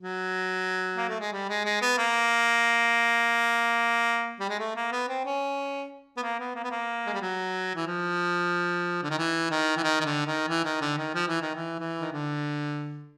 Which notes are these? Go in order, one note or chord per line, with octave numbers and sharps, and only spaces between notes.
F#3
A#3
A3
G#3
G3
G#3
G#3
B3
A#3
G3
G#3
A3
A#3
B3
C4
C#4
B3
A#3
B3
A#3
B3
A#3
G#3
G3
F#3
E3
F3
D3
D#3
E3
D#3
E3
D#3
D#3
D3
D#3
E3
D#3
D3
D#3
F3
E3
D#3
E3
E3
D#3
D3